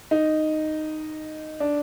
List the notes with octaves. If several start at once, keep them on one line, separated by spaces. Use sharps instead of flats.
D#4
D4